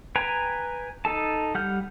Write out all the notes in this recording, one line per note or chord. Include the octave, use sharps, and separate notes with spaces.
B4 G5 G#5 A#5
D#4 A4 A5
G3 F#5 F6 G6